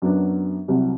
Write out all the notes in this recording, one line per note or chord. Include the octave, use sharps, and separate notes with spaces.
F#2 F#3 B3 D4
C2 C3 F#3